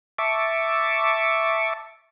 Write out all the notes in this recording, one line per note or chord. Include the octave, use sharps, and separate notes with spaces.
E5 A5 C#6 D6